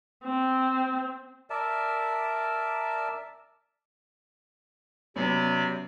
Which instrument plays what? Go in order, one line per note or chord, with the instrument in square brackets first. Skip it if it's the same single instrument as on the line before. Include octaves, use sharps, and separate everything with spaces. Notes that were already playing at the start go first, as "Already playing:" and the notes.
[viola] C4
[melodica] A#4 D5 E5 A5
[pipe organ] C3 D5 [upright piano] F#3 B3 C#4